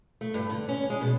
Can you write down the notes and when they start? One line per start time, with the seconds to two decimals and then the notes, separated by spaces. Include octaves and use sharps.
0.21 A3
0.34 G2
0.49 D3
0.69 C#4
0.90 G#3
1.01 B2